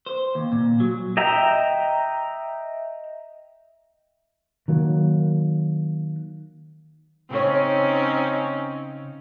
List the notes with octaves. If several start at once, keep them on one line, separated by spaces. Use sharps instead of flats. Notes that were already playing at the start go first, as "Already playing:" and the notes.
C5
D#2
A#2
F#3
D#5 E5 G5 A#5
D#3 F#3 A#3
C#3 C4 C#4 D#4 C#5